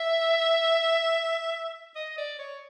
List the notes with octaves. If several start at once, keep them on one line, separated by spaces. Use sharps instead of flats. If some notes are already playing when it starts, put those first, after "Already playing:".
Already playing: E5
D#5
D5
C#5